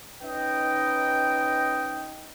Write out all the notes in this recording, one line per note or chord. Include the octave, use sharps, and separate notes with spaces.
C#4 D#4 B4 D#5 G5